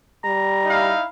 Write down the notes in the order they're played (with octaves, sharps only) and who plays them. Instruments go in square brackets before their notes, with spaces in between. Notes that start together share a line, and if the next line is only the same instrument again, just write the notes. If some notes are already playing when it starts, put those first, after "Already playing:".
[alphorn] G3 [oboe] A#5
[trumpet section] D#4 E4 F5